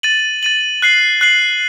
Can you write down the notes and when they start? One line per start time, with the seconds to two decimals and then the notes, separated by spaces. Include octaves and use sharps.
0.03 A6 D#7 F#7
0.43 A6 D#7 F#7
0.82 F#6 C7 F#7
1.21 F#6 C7 F#7